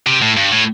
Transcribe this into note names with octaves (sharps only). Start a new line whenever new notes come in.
C3
A2
G2
A2